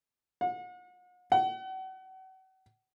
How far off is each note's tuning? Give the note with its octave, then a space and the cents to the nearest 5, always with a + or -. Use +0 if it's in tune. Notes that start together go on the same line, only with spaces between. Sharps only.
F#5 -40
F#5 +40